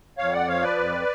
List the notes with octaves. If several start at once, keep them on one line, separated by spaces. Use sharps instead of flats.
F2 C#5 F5
D5 F#5
F3 C#5 F5
B4 D5
F2